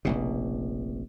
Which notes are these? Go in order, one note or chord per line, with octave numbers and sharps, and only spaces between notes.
F1 A#1 B2